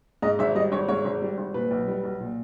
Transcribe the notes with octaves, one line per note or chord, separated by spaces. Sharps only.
G#2 D#5
G#1 E5
G3 D#5
G#1 C#5
G#2 C#5
G#1
G3
G#1
A#2 B4
B1
G3
B1
A#2